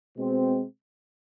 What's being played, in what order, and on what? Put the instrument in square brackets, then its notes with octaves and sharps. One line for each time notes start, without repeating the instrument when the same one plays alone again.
[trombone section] B2 G#3 C4